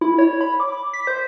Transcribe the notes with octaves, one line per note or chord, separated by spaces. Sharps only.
E4
C#5
B5
D6
B6
C5